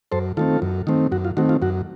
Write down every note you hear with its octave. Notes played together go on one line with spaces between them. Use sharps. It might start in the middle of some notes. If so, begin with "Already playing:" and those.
F#2 A4 C5
D#3 A3 C4 F4 A4
F#2
D#3 A3 C4
F#2 F#4
F4
D#3 A3 C4 F#4
F4
F#2 F#4